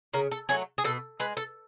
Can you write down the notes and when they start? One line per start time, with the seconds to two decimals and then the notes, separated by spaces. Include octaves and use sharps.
0.14 C#3 A#4
0.31 A4
0.49 F#3 A3 G#4
0.78 G#4
0.84 B2 A4
1.20 G#3 B4
1.37 A4